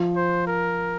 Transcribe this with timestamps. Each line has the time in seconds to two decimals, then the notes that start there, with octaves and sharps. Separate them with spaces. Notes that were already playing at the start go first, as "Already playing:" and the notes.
Already playing: F3
0.16 C5
0.47 A#4